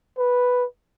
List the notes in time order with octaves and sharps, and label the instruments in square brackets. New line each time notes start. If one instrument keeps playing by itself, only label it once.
[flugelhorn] B4